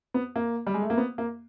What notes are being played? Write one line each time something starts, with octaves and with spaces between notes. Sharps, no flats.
B3
A#3
G3
G#3
A3
A#3
B3
A#3